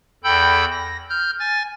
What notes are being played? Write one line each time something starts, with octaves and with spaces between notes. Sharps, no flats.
E2 A4 G5 B5 E6 G6
A#6
F6 G6
G#5 A6